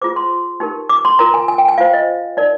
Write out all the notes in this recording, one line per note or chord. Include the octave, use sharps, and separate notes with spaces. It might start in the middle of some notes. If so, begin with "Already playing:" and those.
F4 G#4 C5 D6
C6
D#4 G4 A#4
D6
C6
F4 A#4 A#5
G#5
G#5
G5
G#5
F4 C5 F5
D#5
D#4 A#4 D5